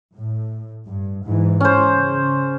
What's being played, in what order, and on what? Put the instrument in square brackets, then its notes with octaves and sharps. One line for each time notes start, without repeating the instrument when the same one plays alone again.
[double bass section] A2
G2
G#2 E3
[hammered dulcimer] C#4 C5
[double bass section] C#3